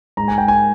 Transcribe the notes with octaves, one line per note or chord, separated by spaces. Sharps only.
G#2 A#5
G#5
G5
G#5